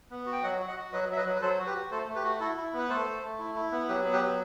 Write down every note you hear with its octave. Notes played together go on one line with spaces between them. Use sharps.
B3
F#4
G5
F#3 D#5 F#5
F#4
D#5 F#5
F#4
F#3 B4 D#5
F#3 E5
B4 D#5
F#3
B4
F#3 A4 C5
F#4
G4 B4
F#4
A3 A4 C5
A3
G4 B4
F#4
E4 F#4 A4
E4
B3 B4
A3 A4 C5
A3
A3
E4
E4
B3
F#3 G4 B4
B3
G4 B4
F#3